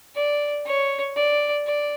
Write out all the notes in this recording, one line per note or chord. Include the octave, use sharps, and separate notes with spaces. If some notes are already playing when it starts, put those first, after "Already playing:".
D5
C#5
D5
D5